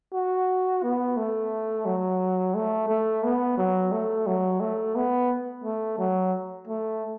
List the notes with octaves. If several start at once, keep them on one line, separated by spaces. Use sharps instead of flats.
F#4
B3
A3
F#3
A3
A3
B3
F#3
A3
F#3
A3
B3
A3
F#3
A3